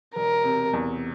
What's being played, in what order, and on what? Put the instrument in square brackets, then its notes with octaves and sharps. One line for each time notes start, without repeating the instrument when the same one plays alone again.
[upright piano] E1 [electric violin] A#4
[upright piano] C3
E2